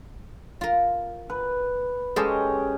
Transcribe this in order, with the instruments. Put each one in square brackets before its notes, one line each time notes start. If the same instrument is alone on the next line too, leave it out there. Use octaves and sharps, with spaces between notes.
[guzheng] F4 A#4
[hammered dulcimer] B4
[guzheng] G#3 A4 C5 [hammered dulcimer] C#4 G4 D#5